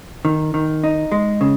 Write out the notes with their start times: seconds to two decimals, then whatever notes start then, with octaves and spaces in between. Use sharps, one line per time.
0.25 D#3
0.54 D#3
0.84 D#4
1.12 G#3
1.41 C#3